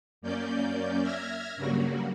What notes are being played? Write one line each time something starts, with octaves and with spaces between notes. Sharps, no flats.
F#2 A#3 C#4 D5 G6
E5 F6 G#6 A#6
G2 C#3 F#3 G3 A#3 F#4